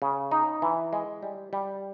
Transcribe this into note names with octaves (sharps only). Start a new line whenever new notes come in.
C#3
D#4
E3
G#3
G3
G3